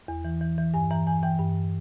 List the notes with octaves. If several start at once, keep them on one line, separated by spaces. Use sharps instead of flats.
E2
E3
E3
E3
G2 G#5
E3 A#5
E3 G#5
E3 G5
G2